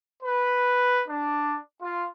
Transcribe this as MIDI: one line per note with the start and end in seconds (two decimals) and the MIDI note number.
0.23 1.02 71
1.08 1.57 62
1.82 2.05 65